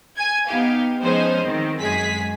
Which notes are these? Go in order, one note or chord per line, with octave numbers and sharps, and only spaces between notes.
G#5 G#6
B3 D#4 G4 F5
F3 G#3 B3 C#4 D#4 C5
D#3 C4
F#2 G#3 G#4 B6